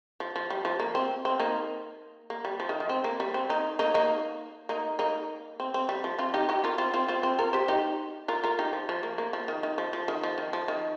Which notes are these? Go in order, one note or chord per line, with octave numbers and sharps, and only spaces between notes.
F3
F3
G3
F3
A#3
C4
C4
A#3 D#4
A#3
G3
F3
D#3
D#3
C4
A#3
G3
C4
A#3 D#4
A#3 D#4
A#3 D#4
A#3 D#4
A#3 D#4
C4
C4
G3
F3
C4 F4
D#4 G4
D#4 G4
F4 A#4
C4 F4
C4 F4
C4 F4
C4
F4 A#4
G4 C5
D#4 G4
F4 A#4
F4 A#4
D#4 G4
F3
F3
A#3
A#3
F3
D#3
D#3
F3
F3
D#3
F3
D#3
F3
D#3